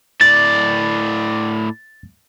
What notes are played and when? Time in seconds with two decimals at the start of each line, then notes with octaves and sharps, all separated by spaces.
0.21 A2 D5 A6